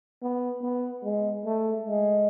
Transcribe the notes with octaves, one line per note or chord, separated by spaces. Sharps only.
B3
B3
G#3
A3
G#3